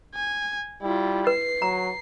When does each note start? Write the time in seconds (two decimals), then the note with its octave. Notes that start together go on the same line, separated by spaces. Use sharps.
0.15 G#5
0.83 G3 E4 F4
1.27 B4 C7
1.62 F#3 A#5